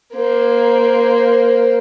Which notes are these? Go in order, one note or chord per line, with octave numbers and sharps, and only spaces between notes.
A#3 C5